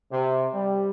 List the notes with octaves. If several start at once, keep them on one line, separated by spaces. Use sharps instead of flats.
C3
G3